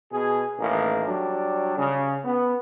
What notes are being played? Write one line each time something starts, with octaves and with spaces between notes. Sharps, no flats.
B2 G#4
A1 D#3 A#3
F#3 G3 D4
C#3
B3